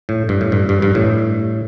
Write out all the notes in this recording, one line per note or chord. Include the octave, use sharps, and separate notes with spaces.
A2
G2
A2
G2
G2
G2
A2